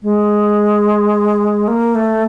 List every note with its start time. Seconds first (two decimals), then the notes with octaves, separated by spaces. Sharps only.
0.03 G#3
1.68 A#3
1.95 A3